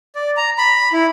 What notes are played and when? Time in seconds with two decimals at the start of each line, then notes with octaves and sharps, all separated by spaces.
0.15 D5
0.37 A#5
0.58 B5
0.93 E4